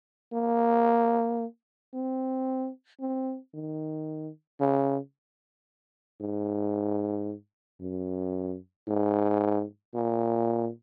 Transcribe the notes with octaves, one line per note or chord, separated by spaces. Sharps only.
A#3
C4
C4
D#3
C#3
G#2
F#2
G#2
A#2